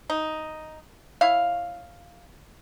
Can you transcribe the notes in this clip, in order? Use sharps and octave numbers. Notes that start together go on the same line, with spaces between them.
D#4
E4 C#5 F5